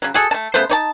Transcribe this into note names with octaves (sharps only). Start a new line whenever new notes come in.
C#3 F#3
F#4 G#4 A4
A3 A5
C#3 A3 B3 C5
D#4 C#5 A5